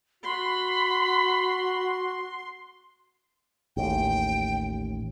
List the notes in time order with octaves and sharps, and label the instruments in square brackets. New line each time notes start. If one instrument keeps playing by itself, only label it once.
[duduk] F#4 [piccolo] B5 [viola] C6
[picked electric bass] A1 D#2 [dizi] G5